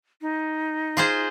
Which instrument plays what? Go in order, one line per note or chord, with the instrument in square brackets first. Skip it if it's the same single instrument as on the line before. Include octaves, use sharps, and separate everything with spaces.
[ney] D#4
[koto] F4 G#4 C5